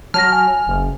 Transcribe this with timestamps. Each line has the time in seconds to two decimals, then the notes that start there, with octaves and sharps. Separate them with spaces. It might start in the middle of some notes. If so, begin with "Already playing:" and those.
0.14 F#3 A5 F6 A#6
0.32 G#5
0.67 F#1